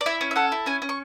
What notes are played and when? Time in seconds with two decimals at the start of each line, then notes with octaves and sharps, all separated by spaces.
0.01 D5
0.06 E4 E5
0.21 C#4
0.31 E5
0.36 A4 F#5
0.52 E4
0.66 C#4 G#5
0.82 C#4
0.89 C#6